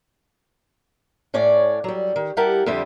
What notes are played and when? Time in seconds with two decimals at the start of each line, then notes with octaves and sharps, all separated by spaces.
1.34 A2 C#4 C#5 D5
1.84 F#3 G3
2.16 D#3
2.37 G3 E4 G4 A#4 F#5 A5
2.66 F2 D3 G3 C5 E5